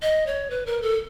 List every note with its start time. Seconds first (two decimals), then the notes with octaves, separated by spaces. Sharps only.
0.02 D#5
0.27 C#5
0.50 B4
0.66 A#4
0.82 A4